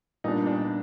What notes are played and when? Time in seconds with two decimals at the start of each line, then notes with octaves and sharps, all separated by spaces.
0.24 A#2 G3 B3 D4 D#4
0.47 D4